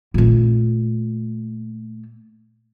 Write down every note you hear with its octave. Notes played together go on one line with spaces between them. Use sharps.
A#2 A3